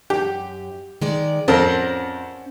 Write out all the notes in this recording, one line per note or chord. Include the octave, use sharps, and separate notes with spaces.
F#2 G4
D#3 G#3 D5
F2 C#4 A#4 C5 F#5